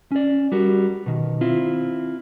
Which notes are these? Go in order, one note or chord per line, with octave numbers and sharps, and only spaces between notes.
C#4 D5
G3 F#4 A#4
B2 D#3
C4 E4 F4